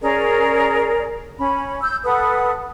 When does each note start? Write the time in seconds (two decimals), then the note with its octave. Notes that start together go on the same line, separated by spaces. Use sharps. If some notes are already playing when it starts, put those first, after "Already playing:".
0.01 C#4 G#4 A#4 D5
1.38 C#4 B5
1.81 E6 G6
2.04 A4 B4 F#5 D#6